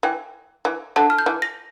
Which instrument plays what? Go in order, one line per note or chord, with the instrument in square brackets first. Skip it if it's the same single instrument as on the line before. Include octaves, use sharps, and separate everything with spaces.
[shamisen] E3 [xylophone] G5
[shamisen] E3
[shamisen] D3 [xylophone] A5
[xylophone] F6
G6
[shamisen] E3
[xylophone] A#6